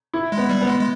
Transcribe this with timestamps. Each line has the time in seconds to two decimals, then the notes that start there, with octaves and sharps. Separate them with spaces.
0.14 E4
0.32 G#3
0.37 B3
0.49 G3
0.61 B3
0.67 G#3
0.80 G#3